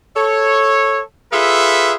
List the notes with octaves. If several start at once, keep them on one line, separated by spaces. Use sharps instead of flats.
A4 C#5
F4 G#4 A4 B4 E5